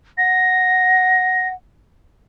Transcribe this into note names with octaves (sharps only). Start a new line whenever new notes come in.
F#5 A#6